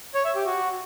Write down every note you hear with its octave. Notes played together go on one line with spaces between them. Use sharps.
C#5
E5
G4
F#4